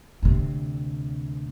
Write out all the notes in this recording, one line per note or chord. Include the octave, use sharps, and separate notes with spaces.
D2 C3